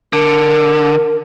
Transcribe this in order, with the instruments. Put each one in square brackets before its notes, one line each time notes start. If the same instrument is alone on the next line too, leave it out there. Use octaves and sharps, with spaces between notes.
[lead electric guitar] D3 [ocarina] A#4